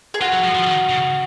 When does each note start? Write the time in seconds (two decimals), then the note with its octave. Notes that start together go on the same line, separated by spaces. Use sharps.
0.14 G#4
0.21 F4 F#4
0.33 F#3
0.44 F3
0.55 F3
0.67 D#3
0.89 C#3